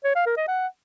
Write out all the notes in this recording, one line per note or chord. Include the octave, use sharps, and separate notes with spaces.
C#5
F5
A#4
D#5
F#5